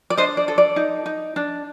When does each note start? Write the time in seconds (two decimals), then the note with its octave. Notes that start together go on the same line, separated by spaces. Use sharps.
0.10 D5
0.17 D4 C5 D#5
0.37 D5
0.48 A4
0.58 D5
0.76 D#4
1.06 D#4
1.36 D4